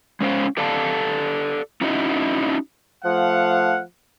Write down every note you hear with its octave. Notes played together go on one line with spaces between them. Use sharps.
G#3 C#4 C5 F5
G4 A4 D5 F5 A5
C#4 D#4 E4 F#4 C5 D#5
F3 A3 F5 F#5